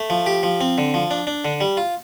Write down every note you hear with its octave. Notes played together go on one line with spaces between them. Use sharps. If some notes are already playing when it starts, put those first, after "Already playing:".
Already playing: A3
F3
G4
F3
C4
D3
F3
D4
D4
D3
G3
F4